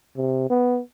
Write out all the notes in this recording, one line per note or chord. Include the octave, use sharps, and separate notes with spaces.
C3
B3